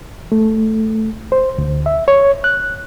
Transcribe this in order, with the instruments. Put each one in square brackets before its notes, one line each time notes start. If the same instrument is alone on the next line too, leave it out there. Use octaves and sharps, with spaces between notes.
[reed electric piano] A3
C5
D2
E5
C#5
F#6